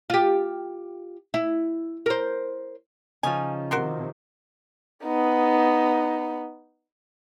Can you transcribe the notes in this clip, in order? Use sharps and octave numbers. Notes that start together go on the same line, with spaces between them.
F4 G4
E4
A#4 C5
C#3 F3 C#4 D#4 G#5
C3 D#3 F#4 A#4 C6
B3 D#4